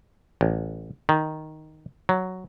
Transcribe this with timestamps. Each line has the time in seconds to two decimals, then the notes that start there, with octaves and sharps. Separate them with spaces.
0.41 A1
1.09 D#3
2.09 F#3